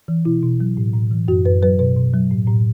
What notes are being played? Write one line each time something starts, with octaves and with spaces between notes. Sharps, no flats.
E3
B2 E4
B2
F#3
A2
A2
E3
F#2 F#4
F#2 B4
F#3 B4
B2 B4
B2
F#3
A2
A2